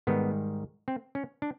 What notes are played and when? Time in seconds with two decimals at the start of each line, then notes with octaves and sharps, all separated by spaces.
0.07 G#2 D#3 G3 B3
0.88 C4
1.15 C#4
1.42 D4